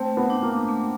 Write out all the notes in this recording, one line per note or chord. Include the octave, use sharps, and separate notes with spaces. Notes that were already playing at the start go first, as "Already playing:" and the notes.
Already playing: A3 C4
B3
D4
A#3
A3